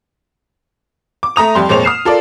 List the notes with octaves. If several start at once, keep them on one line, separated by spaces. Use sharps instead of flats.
D6
A3 A#5 D#6 F7
F2 G3 C6
F2 A#2 G#3 C5 C#5 F7
D#6 F6 C7 E7
F4 A4 A#4 D5